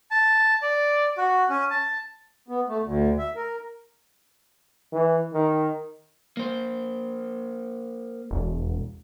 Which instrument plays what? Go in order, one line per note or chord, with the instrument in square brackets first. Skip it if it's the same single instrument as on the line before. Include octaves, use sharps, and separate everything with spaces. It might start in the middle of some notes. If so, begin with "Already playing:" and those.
[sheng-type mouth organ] A5
D5
F#4
C#4
A5
[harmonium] B3
A3
D2
E5
A#4
[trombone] E3
D#3
[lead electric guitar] A#3 C5
[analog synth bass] E1